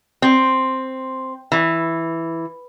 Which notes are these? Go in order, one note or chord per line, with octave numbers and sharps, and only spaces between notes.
C4
E3